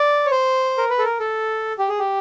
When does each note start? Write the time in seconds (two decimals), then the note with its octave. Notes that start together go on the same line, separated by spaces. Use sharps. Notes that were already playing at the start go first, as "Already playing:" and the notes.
Already playing: D5
0.26 C#5
0.31 C5
0.78 A#4
0.90 B4
0.99 A4
1.05 A#4
1.20 A4
1.79 G4
1.89 G#4
1.99 G4